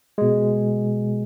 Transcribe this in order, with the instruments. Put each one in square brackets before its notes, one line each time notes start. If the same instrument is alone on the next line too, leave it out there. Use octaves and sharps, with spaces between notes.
[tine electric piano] B2 G#3